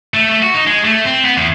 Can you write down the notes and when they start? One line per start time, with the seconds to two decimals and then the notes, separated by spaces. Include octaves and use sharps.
0.14 A3
0.30 A3
0.42 F#4
0.54 D#4
0.67 G#3
0.85 A3
1.05 C4
1.25 B3
1.37 E2